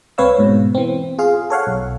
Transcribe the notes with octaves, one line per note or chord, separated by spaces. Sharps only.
C2 C4 B4 C#5 F5 E6
G#2 B2
E3 C4
F4 G#4 F5
A4 C#5 F5 F#5
B1